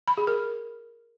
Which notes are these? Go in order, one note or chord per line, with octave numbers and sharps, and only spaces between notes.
B5
G#4
A#4